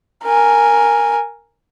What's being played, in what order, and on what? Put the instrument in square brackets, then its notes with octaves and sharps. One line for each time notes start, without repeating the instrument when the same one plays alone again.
[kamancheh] A#4 G#5